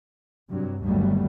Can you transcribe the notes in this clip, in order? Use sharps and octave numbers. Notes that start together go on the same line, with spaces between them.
G2 C3 F#3
G1 D#2 F#3 G3 A3